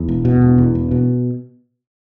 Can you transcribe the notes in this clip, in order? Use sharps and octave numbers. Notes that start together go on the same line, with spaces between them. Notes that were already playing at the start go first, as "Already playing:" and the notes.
Already playing: E2
E1
B2
E1
E2
E1
B2